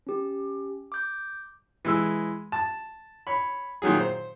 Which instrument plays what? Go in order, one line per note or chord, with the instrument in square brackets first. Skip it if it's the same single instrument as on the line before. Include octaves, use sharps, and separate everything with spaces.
[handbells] C#4 G4
D6 G6
[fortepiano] E3 G#3 E6
A5
C#5 B5
A#2 D#3 F#3 G#4
C5